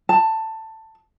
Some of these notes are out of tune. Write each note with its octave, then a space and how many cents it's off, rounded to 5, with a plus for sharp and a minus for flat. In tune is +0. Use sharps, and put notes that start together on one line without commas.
A5 +15